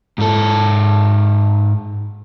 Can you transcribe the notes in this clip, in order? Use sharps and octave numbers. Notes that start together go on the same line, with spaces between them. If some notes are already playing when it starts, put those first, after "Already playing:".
G#2 A4